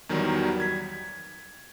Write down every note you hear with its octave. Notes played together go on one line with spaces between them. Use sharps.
E2 D#3 F#3 G3
G#6 B6